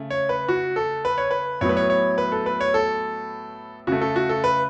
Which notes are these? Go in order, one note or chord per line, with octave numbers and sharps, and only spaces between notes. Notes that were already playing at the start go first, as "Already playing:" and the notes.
Already playing: C#3 A3
C#5
B4
F#4
A4
B4
C#5
B4
A2 F#3 B3 C#5
B4
C#5
C#5
B4
A4
B4
C#5
A4
C#3 A3 F#4
A4
F#4
A4
B4